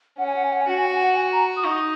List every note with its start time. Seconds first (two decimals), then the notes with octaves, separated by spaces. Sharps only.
0.18 C#4 F#5
0.27 G#5
0.36 F#5
0.44 G#5
0.53 F#5
0.61 G#5
0.68 F#4 F#5
0.78 G#5
0.86 F#5
0.95 G#5
1.04 F#5
1.16 G#5
1.32 A#5
1.57 D#6
1.64 D#4 C#6
1.71 D#6